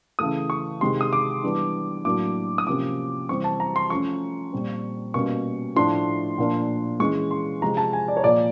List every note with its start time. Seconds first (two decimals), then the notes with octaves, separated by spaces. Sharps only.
0.19 C#3 E3 A3 D#6
0.50 C#6
0.81 C3 D#3 G#3 C6
1.01 D#6
1.13 D6
1.43 E3 G3 B3 D4
2.05 A2 F#3 A#3 D4 D6
2.58 D#6
2.67 C3 F3 A#3 C#4 D6
3.29 C3 E3 G3 C4 C#6
3.44 A5
3.60 A#5
3.76 C6
3.90 F3 A3 C#4 C#6
4.53 A#2 G3 C4
5.14 B2 G3 A#3 C#4 C#6
5.76 A2 F3 A3 D4 C6
6.38 A#2 F3 A#3 D4
7.00 E3 G#3 C#4 C#6
7.31 C6
7.62 C3 F3 G#3 C4 A#5
7.77 A5
7.93 G#5
8.08 D5
8.17 C#5
8.24 A#2 F3 A#3 D5